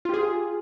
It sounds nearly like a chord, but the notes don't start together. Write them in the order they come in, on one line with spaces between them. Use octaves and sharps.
F4 G4 G#4